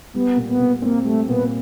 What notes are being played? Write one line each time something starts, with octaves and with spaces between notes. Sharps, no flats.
G3 B3
A#2
B3
A#2
A#3 C4
G3 A3
A#2 B3